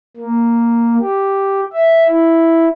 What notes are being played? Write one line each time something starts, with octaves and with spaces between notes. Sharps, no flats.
A#3
G4
E5
E4